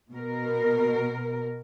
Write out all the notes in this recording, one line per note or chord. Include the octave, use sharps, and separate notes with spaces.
B2 A#4